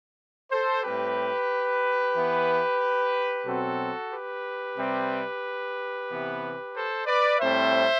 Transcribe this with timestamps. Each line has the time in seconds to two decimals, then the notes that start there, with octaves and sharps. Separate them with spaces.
0.51 A4 C5
0.83 A2 G3 C4 G4 B4
2.14 E3 B3
3.45 B2 F#3 C4 F#4 A4
4.11 G4 B4
4.77 C3 G3 C4
6.08 C3 E3 B3
6.73 A4 C5
7.06 B4 D5
7.39 A2 G3 C4 C5 E5